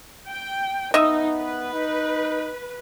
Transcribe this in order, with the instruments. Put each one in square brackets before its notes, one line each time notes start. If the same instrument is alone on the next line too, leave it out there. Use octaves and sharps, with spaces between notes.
[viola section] G5
[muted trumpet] B3 [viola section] D#4 [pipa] D#5 E5
[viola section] B4
[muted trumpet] D#4